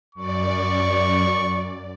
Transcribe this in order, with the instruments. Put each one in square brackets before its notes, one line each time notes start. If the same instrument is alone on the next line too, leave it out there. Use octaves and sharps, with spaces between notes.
[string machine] F#2 D5 [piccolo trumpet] C#6